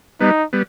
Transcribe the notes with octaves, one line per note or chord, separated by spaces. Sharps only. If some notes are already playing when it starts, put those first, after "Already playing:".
G3 B3 D#4
G3 B3